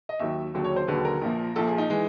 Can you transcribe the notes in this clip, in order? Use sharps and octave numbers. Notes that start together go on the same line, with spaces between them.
D#5
D#2 D#3 F#3 E5
E1 D#2 D3 F#3
C#5
C5
E1 D#2 D3 F#3 B4
A#4
A#1 A#2 F3
A#1 A#2 F3 A4
G#4
D#4
E3 G#3